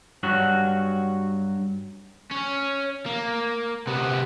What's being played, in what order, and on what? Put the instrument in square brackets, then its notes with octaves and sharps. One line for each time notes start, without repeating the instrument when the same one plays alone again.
[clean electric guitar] G2 F#3 F#4
[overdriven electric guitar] C#4
A#3
C3 B3